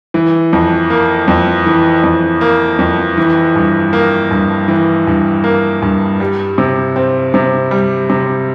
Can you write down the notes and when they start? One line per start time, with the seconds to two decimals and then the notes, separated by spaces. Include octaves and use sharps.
0.14 E3
0.53 F2
0.90 A#3
1.28 F2
1.66 E3
2.04 F2
2.41 A#3
2.79 F2
3.17 E3
3.56 G2
3.93 A#3
4.31 G2
4.68 E3
5.07 G2
5.44 A#3
5.82 G2
6.20 G3
6.58 C3
6.96 C4
7.34 C3
7.71 G3
8.10 C3